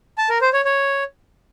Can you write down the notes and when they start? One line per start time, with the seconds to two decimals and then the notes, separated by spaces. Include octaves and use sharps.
0.18 A5
0.30 A#4
0.41 C5
0.53 C#5
0.65 C#5